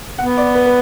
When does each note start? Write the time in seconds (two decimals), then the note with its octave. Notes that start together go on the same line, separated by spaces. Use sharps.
0.18 B3 F#5
0.38 D5
0.55 B4
0.66 B4